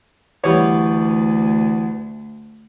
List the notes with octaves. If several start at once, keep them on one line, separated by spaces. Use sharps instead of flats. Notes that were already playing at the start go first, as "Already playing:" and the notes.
D2 E3 G3 B3 C#5